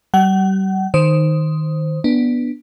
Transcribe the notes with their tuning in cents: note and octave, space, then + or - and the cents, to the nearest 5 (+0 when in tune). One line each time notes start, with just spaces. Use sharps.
G3 -35 F#5 +35
D#3 +0 C5 +0
B3 -15 D4 +0